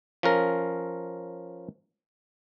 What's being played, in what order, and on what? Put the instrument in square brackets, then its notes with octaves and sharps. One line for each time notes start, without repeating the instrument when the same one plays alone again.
[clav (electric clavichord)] F3 C#4 A#4